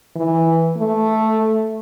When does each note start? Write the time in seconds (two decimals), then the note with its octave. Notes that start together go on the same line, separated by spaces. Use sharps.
0.16 E3
0.77 A3